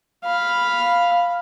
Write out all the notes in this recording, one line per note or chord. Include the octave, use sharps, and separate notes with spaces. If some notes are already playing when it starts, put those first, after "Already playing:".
F5 B5